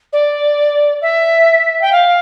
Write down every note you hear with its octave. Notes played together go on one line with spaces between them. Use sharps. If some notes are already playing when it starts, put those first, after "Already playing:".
D5
E5
G5
F5